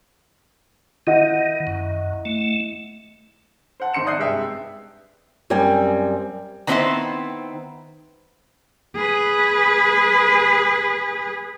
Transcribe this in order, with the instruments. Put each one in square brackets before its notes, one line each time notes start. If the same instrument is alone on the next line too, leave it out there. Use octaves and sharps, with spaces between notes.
[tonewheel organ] D#3 [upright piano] E4 D#5 F#5
[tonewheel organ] F#2
A3
[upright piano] C5 F#5 A5
G#1 D#4 C6 C#7 E7
D5 E5 D#6 F#6 G6 C7
C2 G2 G#3 E5 G5
[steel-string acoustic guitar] F#2 G3 C4 G#5
[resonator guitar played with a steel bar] D#3 B3 C4 D#4 E4 C5
[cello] G#4 B4